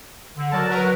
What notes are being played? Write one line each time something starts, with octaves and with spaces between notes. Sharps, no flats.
D3
F#3 A#4 D5 A5
F#3 A#4 B4